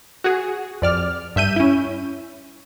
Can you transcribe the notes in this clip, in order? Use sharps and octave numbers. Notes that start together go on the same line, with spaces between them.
F#4 G#4
F2 D5 F6
G2 E5 G6 D#7
C#4 E4